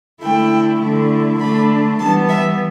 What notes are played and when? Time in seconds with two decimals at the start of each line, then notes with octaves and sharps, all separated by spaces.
0.22 D3 A3 E4 G5
0.81 D3 A3 E4
1.40 D3 A3 D4 B5
1.99 E3 G3 B3 A5
2.28 E5